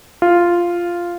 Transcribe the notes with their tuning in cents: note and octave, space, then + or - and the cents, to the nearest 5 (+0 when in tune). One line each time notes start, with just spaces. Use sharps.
F4 -5